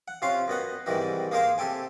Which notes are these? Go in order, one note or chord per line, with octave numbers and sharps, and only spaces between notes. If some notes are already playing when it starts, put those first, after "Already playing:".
F#5
C3 C#4 F4 F5 C6
F#2 B3 D#5 F#5
G#2 C3 D#3 E3 G3 D#4
A#3 D#4 G#4 A#4 C5 F5
C3 G4 A4 G5 G#5